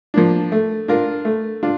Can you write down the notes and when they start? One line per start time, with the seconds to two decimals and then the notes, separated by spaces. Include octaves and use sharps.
0.14 F3 A#3 D4
0.52 A3
0.88 D4 F4 A#4
1.25 A3
1.63 D4 F4